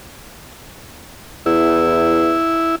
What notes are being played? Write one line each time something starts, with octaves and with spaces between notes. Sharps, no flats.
E2 E4